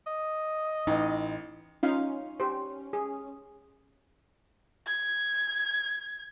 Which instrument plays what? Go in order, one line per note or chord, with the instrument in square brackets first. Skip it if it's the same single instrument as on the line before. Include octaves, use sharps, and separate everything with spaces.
[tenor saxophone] D#5
[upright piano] A1 [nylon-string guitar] D#4
[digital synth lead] C#4 [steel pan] D#4 F4 F5
[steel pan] G4 C5
G#4
[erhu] G#6